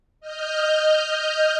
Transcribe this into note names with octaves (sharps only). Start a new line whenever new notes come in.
D#5 F6 G6